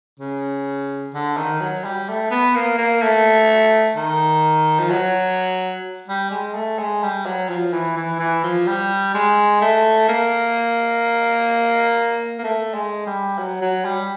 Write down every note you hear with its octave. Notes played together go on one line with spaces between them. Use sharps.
C#3
D3
D#3
F#3
G3
A3
B3
A#3
A#3
A3
D#3
F3
F#3
G3
G#3
A3
G#3
G3
F#3
F3
E3
E3
E3
F3
G3
G#3
A3
A#3
A#3
A3
G#3
G3
F#3
F#3
G3